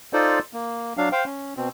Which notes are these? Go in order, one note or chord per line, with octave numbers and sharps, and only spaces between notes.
D#4 F4 A4 C5 D5
A#3
F#3 D4 F5
C5 F5 G5
C#4
B2 C4